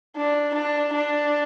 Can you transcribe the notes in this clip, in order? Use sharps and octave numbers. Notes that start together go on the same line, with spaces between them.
D4
D4
D4